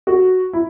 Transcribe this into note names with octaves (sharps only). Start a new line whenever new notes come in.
F#4
E4